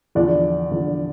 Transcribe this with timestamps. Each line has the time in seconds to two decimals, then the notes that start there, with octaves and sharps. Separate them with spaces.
0.15 E2 D3 F3 D5
0.71 E2 D3 F3